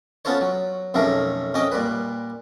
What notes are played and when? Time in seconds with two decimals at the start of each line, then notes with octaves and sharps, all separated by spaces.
0.25 B3 C#4 F4 A4 C5 C#5
0.41 F#3
0.94 B1 F2 C#3 A3 A#4
1.54 F2 C#4 D#5 G5
1.72 A#2 G3 B4